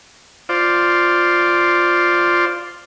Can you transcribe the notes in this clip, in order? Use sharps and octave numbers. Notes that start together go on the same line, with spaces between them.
F4 C5 D5